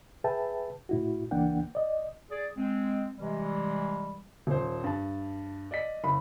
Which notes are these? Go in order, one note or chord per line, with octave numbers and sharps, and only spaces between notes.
G#4 B4 E5 G5 A5
A2 E4 F#4
C#2 E3 A#3 D4 F#5 G5
D5 D#5
G#4 D5
G#3 C4
C3 E3 G3 G#3
D#1 C5
G2 A5
D5 D#5 B6
F#1 B5